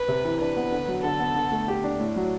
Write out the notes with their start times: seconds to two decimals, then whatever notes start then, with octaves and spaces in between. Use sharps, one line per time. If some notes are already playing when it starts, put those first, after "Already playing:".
Already playing: B4
0.08 C3
0.25 E3
0.40 D4 B4
0.56 B3
0.72 D3
0.88 F#3
1.04 D3 A4
1.20 B3
1.36 D3
1.52 A3
1.68 G4
1.84 D4
2.00 A2
2.16 F#3